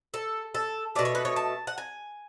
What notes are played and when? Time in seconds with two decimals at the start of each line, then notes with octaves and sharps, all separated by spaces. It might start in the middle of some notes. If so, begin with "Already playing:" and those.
0.14 A4
0.54 A4
0.95 B2 A3 D5
1.05 C#5
1.15 B4
1.25 C#5
1.36 A5
1.67 F#5
1.78 G#5